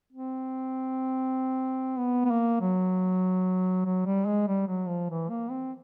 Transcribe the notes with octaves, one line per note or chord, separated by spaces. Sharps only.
C4
B3
B3
A#3
F#3
F#3
G3
G#3
G3
F#3
F3
E3
A#3
C4